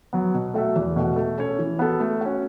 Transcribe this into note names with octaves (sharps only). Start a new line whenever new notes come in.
F#3 B3
B2
A3 F#4 A4 E5
E2
B2 A3 F#4
A3
C#4 A4 C#5
E3
B3 F#4 A4
A3
C#4 F#4